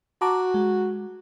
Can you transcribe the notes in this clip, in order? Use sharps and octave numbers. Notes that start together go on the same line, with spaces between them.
F#4 A5 A#5 D6
G#3